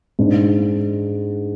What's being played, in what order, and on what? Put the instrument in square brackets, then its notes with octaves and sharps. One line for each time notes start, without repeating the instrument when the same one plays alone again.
[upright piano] G#2 G#3 D4